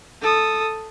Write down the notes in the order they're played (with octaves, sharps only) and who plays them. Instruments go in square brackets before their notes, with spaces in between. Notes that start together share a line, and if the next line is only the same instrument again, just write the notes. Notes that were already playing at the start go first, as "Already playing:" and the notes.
[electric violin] A4 D#6